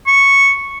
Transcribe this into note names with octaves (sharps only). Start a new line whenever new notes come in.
C#6